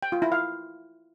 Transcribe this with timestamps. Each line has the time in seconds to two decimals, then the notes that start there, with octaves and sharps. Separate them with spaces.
0.03 G5
0.12 F4
0.22 E4
0.32 F5